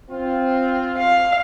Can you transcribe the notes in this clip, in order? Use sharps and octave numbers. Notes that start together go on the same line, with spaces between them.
C4 F4
F5